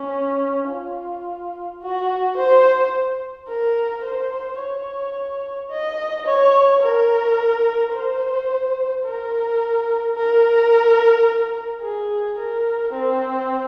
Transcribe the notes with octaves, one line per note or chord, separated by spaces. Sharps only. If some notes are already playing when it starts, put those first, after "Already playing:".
Already playing: C#4
F4
F#4
C5
A#4
C5
C#5
D#5
C#5
A#4
C5
A#4
A#4
G#4
A#4
C4